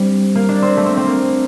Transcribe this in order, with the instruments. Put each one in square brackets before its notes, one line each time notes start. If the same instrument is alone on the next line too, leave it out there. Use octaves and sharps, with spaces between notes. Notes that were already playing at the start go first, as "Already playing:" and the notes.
Already playing: [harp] G3 C4 D4
A#3
D4
C4
A3
C4
C4
A#3